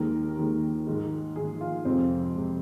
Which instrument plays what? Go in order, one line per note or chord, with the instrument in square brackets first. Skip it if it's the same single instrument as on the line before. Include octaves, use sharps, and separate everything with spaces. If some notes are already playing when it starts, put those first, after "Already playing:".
Already playing: [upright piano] D#2 D#3 G#3 A#4
D#2 D#3 G#3
G#2 D#3 G#3
G#2 D#3 G#3 G#4
F4
F2 C3 G#3 C4
C3 G#3